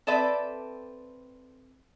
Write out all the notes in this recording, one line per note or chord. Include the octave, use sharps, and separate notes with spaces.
C4 A4 B4 D5 E5